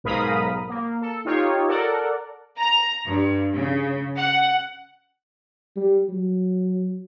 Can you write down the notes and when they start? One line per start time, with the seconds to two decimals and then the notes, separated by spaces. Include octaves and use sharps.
0.04 B1 G#2 A#4 F5 B5 D#6
0.69 A#3
1.02 A4
1.25 D#4 F4 G4 C#5
1.67 A4 A#4 D5 F#5
2.57 A#5
3.05 G2
3.53 C#3
4.16 F#5
5.76 G3
6.09 F#3